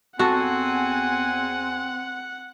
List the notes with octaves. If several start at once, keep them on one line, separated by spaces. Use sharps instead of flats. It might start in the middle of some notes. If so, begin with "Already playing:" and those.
E2 C4 F#4 A4 F#5 G#5